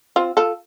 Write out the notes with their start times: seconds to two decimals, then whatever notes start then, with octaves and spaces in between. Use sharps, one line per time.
0.16 C4 F4
0.37 F4 A4